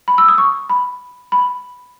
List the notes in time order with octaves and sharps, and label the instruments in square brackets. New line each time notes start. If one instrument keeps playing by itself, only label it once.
[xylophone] B5
E6
D#6
C#6
B5
B5